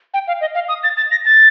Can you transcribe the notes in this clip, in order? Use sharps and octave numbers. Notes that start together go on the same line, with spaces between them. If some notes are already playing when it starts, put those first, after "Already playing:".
G5
F5
D#5
F5
D#6
A6
A6
A#6
A6